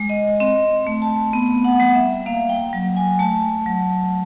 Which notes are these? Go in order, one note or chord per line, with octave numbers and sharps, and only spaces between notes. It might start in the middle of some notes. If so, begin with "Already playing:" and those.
Already playing: G#3
D#5
C4 D#5
A3
A5
B3
F#5
G3
E5
A#3 F5
G5
F#3
G#5
A3 A5
F#3